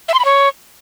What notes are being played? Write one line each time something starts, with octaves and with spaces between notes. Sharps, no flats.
E5
C6
B5
C#5